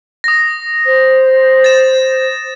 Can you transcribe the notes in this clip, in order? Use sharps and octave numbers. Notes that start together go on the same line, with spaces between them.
D#6 A#6
C5
A6 E7